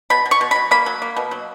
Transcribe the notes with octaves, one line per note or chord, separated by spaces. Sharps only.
B2 B5
B2
C#6
B2
F#3 B5
A#3 B5
F#3
A#3
B2
F#3